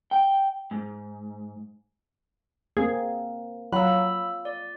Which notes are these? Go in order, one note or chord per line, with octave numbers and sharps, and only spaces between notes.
G5
G#2
A#3 C4 G#4
F#3 F4 B5 E6
D5